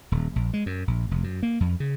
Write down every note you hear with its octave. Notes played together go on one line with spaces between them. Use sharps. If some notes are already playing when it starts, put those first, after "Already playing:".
D#1
A#1
G#3
F#2
A#1
F1
F#2
A#3
F2
C#3